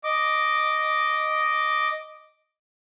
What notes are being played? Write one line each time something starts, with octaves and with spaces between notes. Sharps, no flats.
D#5 D6